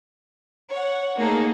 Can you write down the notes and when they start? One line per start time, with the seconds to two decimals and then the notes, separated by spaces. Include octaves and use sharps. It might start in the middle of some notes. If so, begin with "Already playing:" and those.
0.71 C#5 F#5
1.17 A3 A#3 D#4 G#4 A4